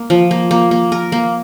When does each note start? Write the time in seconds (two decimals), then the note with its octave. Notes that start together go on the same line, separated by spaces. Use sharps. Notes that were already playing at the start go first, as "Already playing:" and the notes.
Already playing: A#3
0.10 F3
0.31 A#3
0.51 A#3
0.71 A#3
0.92 A#4
1.12 A#3